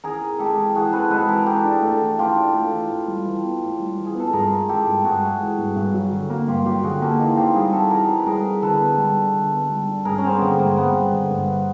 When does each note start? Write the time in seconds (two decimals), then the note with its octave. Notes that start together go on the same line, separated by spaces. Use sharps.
0.04 E3 G#4 A#4
0.22 C4
0.39 G#3 G4 A4
0.58 E3
0.75 E3 F#4 G#4
0.93 C4 A4 B4
1.11 G#3 A4 B4
1.29 E3 G#4 A#4
1.46 E3 G4 A4
1.65 D4
1.82 A3
2.00 E3
2.19 E3 F4 G4
2.37 D4
2.54 A3
2.72 E3
2.90 A2
3.08 G3
3.26 E3
3.44 B3
3.62 A2
3.80 G3
3.98 E3
4.05 G#4
4.15 B3 A4
4.33 G2 G#4 A#4
4.51 G#3
4.69 E3 G4 A4
4.87 G2
5.04 G2 F#4 G#4
5.22 G#3
5.41 E3
5.59 G2
5.76 G2
5.94 F#3
6.12 D3
6.30 A#3
6.48 G2 F4 G4
6.65 F#3 F4 G4
6.83 D3 F#4 G#4
7.02 A#3 G4 A4
7.19 E3 D#4 F4
7.37 C4 F4 G4
7.55 G3 F#4 G#4
7.72 E3 G4 A4
7.91 E3 G#4 A#4
8.09 C4
8.19 B4
8.26 G3 G#4 A#4
8.45 E3
8.62 D3 A4 B4
8.80 B3
8.98 G3
9.16 D4
9.34 D3
9.52 B3
9.70 G3
9.88 D4
10.05 G2 G#4 A#4
10.18 C#4
10.23 G3 C4
10.34 B3
10.41 D3 A#3
10.59 G2 A#3 C4
10.77 G2 B3
10.95 G3
11.12 D3
11.31 G2